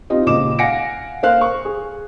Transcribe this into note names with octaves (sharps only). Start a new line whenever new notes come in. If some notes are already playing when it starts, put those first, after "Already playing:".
C4 D#4 F4 G4 D#5
D#1 C#2 D#5 D6 E7
F5 F#5 G#5 A#6 C#7 D7
A#3 C5 F5 F#6
C#6
G#4